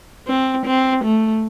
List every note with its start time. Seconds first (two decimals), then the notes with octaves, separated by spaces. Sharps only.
0.28 C4
0.66 C4
1.05 A3